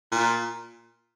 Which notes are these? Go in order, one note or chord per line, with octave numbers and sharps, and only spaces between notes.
A#2